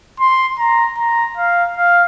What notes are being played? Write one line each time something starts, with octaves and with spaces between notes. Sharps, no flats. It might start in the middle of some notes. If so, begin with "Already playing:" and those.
C6
A#5
A#5
F5
F5